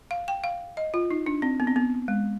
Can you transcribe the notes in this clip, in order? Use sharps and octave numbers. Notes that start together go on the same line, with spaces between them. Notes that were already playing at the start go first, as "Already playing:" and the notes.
F5
G5
F5
D#5
F4
D#4
D4
C4
B3
C4
B3
G#3